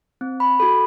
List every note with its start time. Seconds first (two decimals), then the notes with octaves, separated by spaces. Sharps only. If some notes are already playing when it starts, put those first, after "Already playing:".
0.21 C4
0.40 B5
0.60 F#4 A4 B5